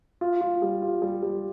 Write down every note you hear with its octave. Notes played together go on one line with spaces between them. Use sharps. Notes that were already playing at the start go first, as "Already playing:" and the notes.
F4
F4
G3
F4
G3
G3